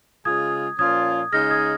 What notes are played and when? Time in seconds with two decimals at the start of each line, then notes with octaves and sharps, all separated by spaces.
0.25 C#3 G#3 F4 G#4 D#6 G#6
0.79 A#2 F3 C#4 F4 D#6 G#6
1.32 C#3 G#3 D#4 G#4 F6 A#6
1.50 D#6 G#6